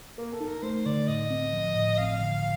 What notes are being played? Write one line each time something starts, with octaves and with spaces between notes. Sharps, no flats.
A#3 A#4
A4
D#4
A#4
A3 C5
D3 D5
A2 D#5
C4
F3
A2
G1 F5
D3